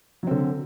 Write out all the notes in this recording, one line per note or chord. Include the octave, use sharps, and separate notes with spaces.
D3 F#3 C4